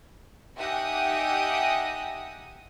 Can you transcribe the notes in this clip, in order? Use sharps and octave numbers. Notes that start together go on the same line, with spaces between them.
D#4 G4 E5 F#5 G#5 D#6